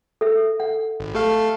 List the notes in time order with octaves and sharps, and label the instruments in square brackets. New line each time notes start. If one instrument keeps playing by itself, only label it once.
[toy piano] A4 E5
F#5
[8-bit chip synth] G#1
[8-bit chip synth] A3 A4 F5 [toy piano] G4